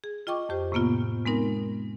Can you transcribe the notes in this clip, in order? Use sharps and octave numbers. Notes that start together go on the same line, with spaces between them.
G#4
F4 D#5 G5 C#6 D6
F2 G4 C5
A2 C3 A#3 B3 F4
G#3 B3 C4 D#4 A#4